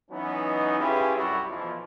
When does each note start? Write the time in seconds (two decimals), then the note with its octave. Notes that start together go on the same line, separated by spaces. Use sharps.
0.11 E3 F#3 B3 C#4 D#4
0.79 C#4 E4 F4 G4 G#4 B4
1.15 C2 F#2 G3 E4 F#4
1.48 B1 B2 E3 F3